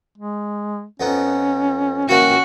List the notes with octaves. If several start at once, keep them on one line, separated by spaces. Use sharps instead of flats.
G#3
F2 B3 C#4 D#4
E3 A#3 C#4 F#4 G5